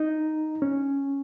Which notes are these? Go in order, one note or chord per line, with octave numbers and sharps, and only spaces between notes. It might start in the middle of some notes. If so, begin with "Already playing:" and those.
Already playing: D#4
C#4